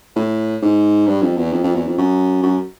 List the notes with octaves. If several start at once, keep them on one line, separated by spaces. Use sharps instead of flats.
A2
G#2
G2
F2
E2
F2
F2
E2
F2
F#2
F#2